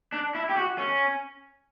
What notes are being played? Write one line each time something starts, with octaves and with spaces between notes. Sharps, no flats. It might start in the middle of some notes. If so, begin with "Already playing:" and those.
D4
E4
G4
F#4
C#4